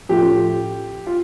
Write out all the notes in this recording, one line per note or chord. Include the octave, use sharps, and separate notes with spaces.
A2 F3 A3 C#4 F4 G4
F4